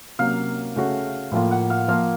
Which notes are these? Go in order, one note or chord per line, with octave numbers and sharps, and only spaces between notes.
C3 F#3 A#3 C#4 F5
C#3 A3 C#4 F#4
A2 F3 A#3 F4
F#5
F5
F3 A#3 F4 F5